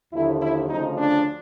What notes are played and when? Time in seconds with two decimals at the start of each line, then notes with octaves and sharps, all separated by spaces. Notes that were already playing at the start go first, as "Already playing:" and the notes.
0.13 D#2 D3 F3 E4
0.41 E4
0.69 D2 C#3 F3 D#4
0.98 D4